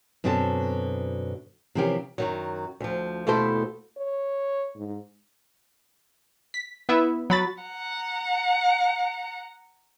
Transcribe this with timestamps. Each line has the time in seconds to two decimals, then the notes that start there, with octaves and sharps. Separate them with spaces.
0.24 F#2 B2 D3 C4 G5 A5
1.75 C3 E3 F3 C#4 G4 A#4
2.18 F#2 D#3 F#3
2.80 D2 F3
3.27 D#2 B2 A3 E4 A4 C5
3.97 C#5
4.76 G#2
6.54 B6
6.89 B3 E4 E5
7.30 F#3 B5 A6
7.62 F#5 A#5